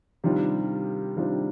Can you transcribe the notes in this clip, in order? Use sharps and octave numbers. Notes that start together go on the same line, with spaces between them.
C3 D#3 G3 D4 F4
C3 D#3 G3 D4 F4